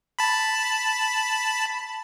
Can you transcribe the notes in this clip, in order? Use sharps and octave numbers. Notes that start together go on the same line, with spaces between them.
A5 B5